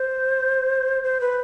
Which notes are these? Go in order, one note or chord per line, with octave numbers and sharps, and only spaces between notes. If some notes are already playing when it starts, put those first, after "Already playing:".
Already playing: C5
C5
B4